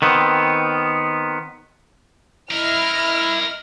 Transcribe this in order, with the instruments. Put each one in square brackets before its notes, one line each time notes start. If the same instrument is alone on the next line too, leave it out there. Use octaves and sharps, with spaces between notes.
[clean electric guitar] D#3 B3 C4
[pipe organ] E4 [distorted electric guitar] A#4 E5 [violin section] D#5 F6